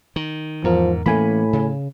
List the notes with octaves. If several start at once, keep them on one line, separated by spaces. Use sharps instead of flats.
D#3
E2 G#2 F3 A#4
A2 E3 A3 A#3 C#4 G#5 B5
C#3